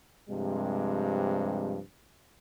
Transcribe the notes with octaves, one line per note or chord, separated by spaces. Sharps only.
G2 C3 F3 G#3